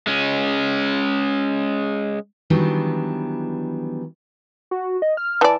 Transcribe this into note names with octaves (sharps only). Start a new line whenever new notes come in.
G#3 C#4
D#3 E3 F#3 G3 B3 D4
F#4
D#5
F6
E3 D5 A5